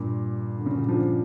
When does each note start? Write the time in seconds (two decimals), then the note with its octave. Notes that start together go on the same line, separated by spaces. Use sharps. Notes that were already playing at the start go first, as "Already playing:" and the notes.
Already playing: G2 A#2
0.59 D3
0.66 C#3
0.74 A#2 D3
0.88 D3 F3